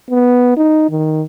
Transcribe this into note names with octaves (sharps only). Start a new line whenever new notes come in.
B3
D#4
D#3